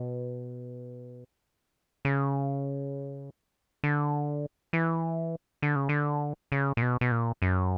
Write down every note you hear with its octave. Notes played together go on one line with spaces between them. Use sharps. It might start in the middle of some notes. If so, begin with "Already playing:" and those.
Already playing: B2
C#3
D3
E3
D3
C#3
D3
C#3
A#2
B2
B2
A#2
F#2